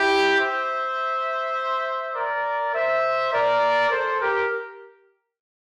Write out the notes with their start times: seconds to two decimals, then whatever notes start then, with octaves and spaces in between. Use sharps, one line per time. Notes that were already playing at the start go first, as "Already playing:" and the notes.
Already playing: E4 G4
0.38 C5 E5
2.14 A#4 D5
2.74 C5 E5
3.32 A#4 D5
3.91 A4 C5
4.20 G4 A#4